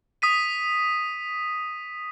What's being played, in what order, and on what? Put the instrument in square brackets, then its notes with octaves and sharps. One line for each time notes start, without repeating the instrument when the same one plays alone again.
[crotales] D#6 B6 D#7